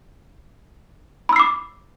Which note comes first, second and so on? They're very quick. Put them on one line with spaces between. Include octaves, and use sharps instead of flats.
B5 E6 C7 D6